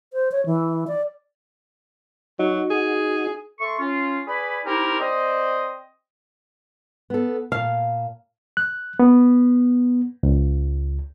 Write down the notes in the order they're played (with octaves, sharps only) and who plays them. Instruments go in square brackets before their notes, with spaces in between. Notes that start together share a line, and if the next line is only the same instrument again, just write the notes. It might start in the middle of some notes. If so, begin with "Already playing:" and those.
[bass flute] C5
C#5
E3
D5
[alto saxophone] F#3 [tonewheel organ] D#4 F#4
[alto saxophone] G#4
[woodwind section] A3 A4 C6 C#6
C#4 F4
G#4 B4 D5 G#5 B5
C4 D#4 E4 G4 A#4
C4 C5 D5 D#5
[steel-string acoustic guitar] B3 A4
[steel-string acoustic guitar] A#2 A5 [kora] F5
[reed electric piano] F#6
B3
C#2